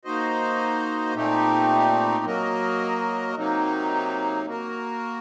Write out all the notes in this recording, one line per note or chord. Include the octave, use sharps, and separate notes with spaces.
A#3 D#4 F#4 C5 D#5
A#2 A3 C4 D#4 G4
F#3 A#3 F#4 A#4 D#5
C3 F#3 A#3 D#4
A#3 F#4 A#4